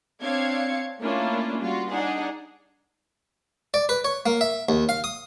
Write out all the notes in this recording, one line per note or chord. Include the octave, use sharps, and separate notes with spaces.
C4 D4 C#5 F5 G#6 C#7
A3 A#3 C#4 D4 E4 F4
G3 F4 F#4
D4 D#4 G#4 F#5
D5
B4
C#5
A#3
E5
D#2
F5
D#6